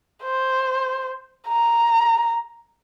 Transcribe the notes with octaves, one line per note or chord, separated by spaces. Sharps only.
C5
A#5